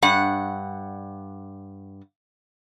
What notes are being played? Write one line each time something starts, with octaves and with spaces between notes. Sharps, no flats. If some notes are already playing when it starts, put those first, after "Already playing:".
G2 F#5